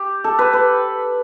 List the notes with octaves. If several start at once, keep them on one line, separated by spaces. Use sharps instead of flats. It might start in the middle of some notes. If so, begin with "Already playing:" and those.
Already playing: G4
A4
B4
B4